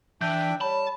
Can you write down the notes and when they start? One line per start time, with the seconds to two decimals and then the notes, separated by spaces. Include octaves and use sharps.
0.21 E3 D4 E5 G5 G6
0.61 G3 C#5 A5 B5